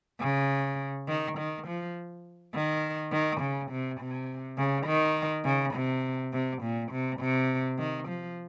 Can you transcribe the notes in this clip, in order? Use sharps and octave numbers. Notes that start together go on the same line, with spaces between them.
C#3
D#3
D#3
F3
D#3
D#3
C#3
C3
C3
C#3
D#3
C#3
C3
C3
A#2
C3
C3
D#3
F3